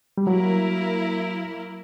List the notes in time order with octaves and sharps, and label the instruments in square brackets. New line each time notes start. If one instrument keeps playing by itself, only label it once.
[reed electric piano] G3
[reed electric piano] F#3 [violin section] A#3 E4 A#4